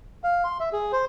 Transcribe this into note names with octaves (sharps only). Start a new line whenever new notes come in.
F5
C6
E5
G#4
C5